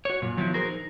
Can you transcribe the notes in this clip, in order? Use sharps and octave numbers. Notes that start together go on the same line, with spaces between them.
F#4 C#5
F#2 A#2
D#3 F3 F#3 B3 E4
F#4 G#4 A#4 C5
D#4